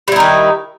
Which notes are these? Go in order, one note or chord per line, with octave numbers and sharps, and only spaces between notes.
D#3 G3 D#4 E4